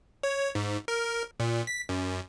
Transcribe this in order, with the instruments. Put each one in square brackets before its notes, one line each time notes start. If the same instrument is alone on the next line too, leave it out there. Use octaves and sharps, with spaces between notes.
[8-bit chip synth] C#5
G#2
A#4
A#2
B6
F#2